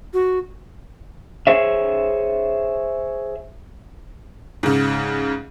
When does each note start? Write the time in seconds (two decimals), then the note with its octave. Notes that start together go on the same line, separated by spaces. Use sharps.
0.14 F#4
1.47 G#4 C5 C#5 E5
4.63 G#2 C#3